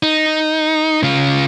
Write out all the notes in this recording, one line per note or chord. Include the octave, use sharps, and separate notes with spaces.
D#4
C#3 F4